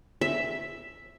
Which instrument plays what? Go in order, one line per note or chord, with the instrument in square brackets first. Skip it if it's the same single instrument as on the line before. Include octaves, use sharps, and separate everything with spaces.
[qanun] E5